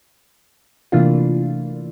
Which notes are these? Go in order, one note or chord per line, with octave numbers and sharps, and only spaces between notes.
C3 E3 A3 A#3 D4 F4